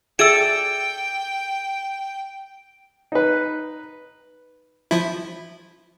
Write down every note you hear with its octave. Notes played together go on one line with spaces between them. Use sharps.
G#4 A4 D5 E5 G5 G#5 E6 D7
D#4 B4
F3 E4